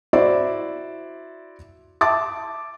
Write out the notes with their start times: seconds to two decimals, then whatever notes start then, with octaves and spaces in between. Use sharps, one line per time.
0.13 E4 F#4 C5 D5 E5
2.01 E5 A5 D6 A6